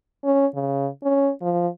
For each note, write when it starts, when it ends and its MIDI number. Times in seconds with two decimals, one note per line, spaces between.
0.24 0.46 61
0.55 0.88 49
1.04 1.31 61
1.42 1.68 53